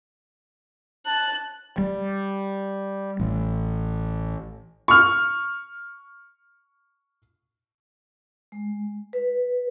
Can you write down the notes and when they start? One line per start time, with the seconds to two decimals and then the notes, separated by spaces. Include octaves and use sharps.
1.06 A5 F#6
1.78 G3
3.20 A1
4.88 C#6 F6
8.52 G#3
9.13 B4